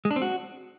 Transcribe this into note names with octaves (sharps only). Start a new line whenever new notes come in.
G#3
D4
C4
F#4